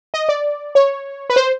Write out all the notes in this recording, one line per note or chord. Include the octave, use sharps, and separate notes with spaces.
D#5
D5
C#5
B4
C5